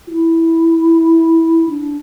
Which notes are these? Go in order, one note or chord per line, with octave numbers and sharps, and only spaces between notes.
F4
E4
D4